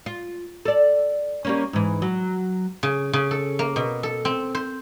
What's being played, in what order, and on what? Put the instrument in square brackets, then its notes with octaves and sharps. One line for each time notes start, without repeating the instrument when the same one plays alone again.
[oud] F4
A4 D5
G3 A#3 C#4
G#2 E3
F#3
[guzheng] C#3
C#3
A4
A#3
B2
A4
C4
C5